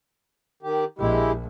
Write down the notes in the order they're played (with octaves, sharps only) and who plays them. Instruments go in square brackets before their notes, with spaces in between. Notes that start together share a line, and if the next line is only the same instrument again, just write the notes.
[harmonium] D#3 G4
[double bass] A#1 [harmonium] G#3 E4 G4